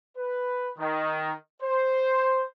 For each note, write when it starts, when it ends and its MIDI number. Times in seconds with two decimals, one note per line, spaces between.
0.16 0.69 71
0.78 1.31 51
1.62 2.44 72